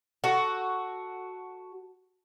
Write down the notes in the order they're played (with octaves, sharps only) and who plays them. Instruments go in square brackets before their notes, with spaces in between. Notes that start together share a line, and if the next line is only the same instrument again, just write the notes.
[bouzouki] F#4 A4